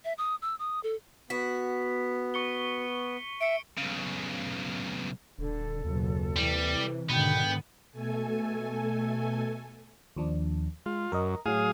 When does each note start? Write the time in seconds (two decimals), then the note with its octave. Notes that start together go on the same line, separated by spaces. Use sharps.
0.05 E5
0.18 D#6
0.42 E6
0.59 D#6
0.83 A4
1.30 B3 F#4 B6
2.34 C#6 C#7 G7
3.41 E5 C#7 D7
3.78 B1 C#3
5.39 D#1 D3 A4
5.85 F#1 D#2 B2
6.37 C3 E3 G3
7.10 G#2 B2 D3 D#3 B3 G5 G6
7.92 B2 A3 A4 G#5
10.17 D#2 F3 D4
10.86 G#3 F4
11.12 F#2 A#4 D#5
11.46 A2 F#3 G#4 F5 D#6